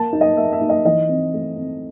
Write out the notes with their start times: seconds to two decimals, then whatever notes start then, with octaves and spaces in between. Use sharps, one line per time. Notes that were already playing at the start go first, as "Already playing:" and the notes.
Already playing: A#3 A5
0.13 D#4
0.21 D#5
0.37 A#3 E5
0.53 E5
0.61 D#4
0.69 D#5
0.85 E3 D#5
1.09 C4
1.34 A3
1.57 C4